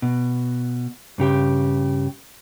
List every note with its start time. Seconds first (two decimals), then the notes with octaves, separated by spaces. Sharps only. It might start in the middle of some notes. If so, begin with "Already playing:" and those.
0.02 B2
1.18 G2 C#3 G4 G5